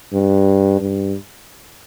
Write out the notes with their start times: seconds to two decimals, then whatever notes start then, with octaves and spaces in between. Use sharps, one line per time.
0.13 G2
0.81 G2